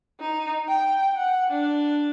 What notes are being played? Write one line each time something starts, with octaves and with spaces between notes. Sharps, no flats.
D#4
G5
F#5
D4